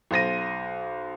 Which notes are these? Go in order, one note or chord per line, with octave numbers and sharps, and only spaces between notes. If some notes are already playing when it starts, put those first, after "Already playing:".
B1 C5 A#6 D#7